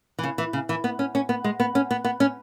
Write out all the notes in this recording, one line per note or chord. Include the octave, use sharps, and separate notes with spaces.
E3
C#3
E3
C#3
E3
B3
C#4
C#4
B3
G#3
B3
C#4
B3
B3
C#4